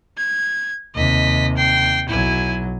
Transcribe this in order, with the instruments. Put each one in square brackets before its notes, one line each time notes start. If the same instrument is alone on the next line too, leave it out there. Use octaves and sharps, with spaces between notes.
[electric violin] G#6
[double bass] D#2 C3 [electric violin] D#5 B6
[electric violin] G5 C7
[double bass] B1 F#3 [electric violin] E4 G#5